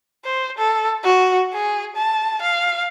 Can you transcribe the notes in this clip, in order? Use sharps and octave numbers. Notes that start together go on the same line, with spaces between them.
C5
A4
F#4
G#4
A5
F5